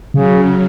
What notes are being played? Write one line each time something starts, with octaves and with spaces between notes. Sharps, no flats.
C#3 F#3